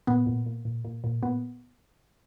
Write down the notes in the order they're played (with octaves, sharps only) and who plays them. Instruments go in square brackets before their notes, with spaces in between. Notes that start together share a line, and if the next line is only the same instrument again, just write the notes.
[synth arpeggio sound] A#2 B3
A#2
A#2
A#2
A#2
A#2
A#2 B3